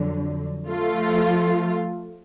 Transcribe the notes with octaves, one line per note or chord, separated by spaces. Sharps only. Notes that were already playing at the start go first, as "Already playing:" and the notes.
Already playing: F2 D3 F#3
F3 A3 F4